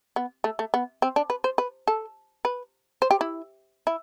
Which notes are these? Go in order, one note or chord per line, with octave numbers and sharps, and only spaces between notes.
B3
A3
A3
B3
C4
D4
B4
C5
B4
A4
B4
C5
G4
E4
E4